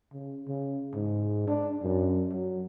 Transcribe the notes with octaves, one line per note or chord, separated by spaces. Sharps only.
C#3
C#3
G#2
D4
F#2
F#3